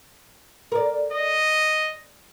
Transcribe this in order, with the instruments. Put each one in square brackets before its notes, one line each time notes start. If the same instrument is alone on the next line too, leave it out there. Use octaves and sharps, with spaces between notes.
[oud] A#4 D5
[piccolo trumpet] D#5